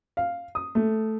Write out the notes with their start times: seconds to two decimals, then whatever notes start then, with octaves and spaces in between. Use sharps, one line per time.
0.17 F5
0.55 D#6
0.75 A3